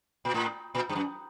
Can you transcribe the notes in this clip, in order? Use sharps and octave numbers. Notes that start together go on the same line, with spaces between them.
A#2
A2
A#2
G2
F#2